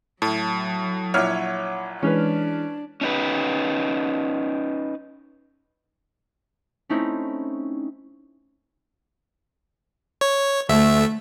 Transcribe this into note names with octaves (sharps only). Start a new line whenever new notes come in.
A2 F#3 A5
A#1 E4 C#5 F#5 F6
E3 G#3 C#4 D4 B4 F6
C#4 D#4 B4
A3 C4 C#4 D#4 E4
C#5
D2 A3 E5